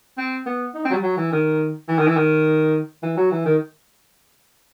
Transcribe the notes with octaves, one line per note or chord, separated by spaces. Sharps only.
C4
B3
D#4
C4
F#3
G3
F#3
E3
D#3
E3
D#3
E3
D#3
E3
F#3
E3
D#3